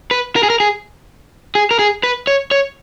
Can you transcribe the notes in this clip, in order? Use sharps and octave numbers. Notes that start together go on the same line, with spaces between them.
B4
A#4
G#4
A#4
G#4
G#4
A#4
G#4
B4
C#5
C#5